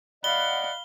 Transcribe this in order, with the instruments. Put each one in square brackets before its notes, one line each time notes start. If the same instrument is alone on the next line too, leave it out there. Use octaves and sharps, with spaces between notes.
[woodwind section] D5 D#5 F#5 [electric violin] F5 B5 [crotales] G7